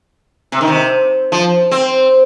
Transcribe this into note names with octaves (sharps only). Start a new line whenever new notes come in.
C3
D#3
C3
F3
C4